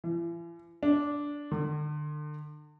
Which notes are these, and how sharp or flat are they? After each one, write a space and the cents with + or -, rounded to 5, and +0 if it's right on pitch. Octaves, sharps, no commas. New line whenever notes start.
E3 +40
D4 -10
D3 +35